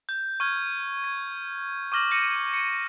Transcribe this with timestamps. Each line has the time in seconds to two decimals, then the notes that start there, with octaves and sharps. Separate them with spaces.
0.09 G6
0.40 C#6 F6 G#6
1.04 G#6
1.92 C#6 D6 F6 A#6 F#7
2.11 G6 A#6 C#7 D#7
2.53 C#7